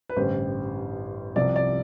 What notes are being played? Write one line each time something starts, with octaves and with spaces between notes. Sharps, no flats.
B4
A1 G2 D3 G3 C5
C2 C3 F3 D5
D5